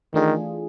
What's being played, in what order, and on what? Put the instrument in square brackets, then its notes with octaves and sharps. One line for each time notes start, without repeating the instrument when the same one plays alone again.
[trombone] D#3 [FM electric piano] E3 A3 D4 F4 G#4